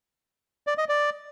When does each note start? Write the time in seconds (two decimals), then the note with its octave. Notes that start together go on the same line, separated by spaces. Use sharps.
0.67 D5
0.78 D#5
0.89 D5